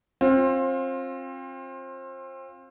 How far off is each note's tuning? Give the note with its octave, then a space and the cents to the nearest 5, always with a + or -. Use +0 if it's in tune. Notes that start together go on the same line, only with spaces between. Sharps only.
C4 +30 F4 +20